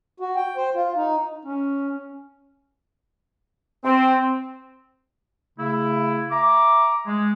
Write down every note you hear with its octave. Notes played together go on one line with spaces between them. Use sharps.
F#4
G5
C5
F4
D#4
C#4
C4
C#3 A3 E4
E5 A#5 D6
G#3